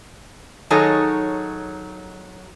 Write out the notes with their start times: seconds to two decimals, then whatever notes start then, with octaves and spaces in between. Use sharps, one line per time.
0.70 D#3 F#3 D#4 G#4 A4 C#5